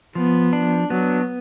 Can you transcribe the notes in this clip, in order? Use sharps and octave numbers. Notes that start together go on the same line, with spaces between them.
F3 B3
D4
F#3 B3